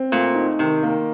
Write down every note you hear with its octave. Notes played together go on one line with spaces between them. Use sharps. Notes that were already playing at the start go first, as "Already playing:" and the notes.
Already playing: C4
A#2 A3
D#4
C3 D#3
A#3